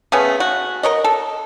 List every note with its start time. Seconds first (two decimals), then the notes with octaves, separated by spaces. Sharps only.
0.12 C#3 A3 B3 C#4
0.40 F#4
0.83 A#4 C#5 D#5
1.04 A4